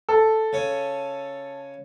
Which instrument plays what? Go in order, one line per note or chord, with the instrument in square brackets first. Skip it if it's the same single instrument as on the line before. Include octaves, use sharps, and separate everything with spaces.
[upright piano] A4
[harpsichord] C#3 C#4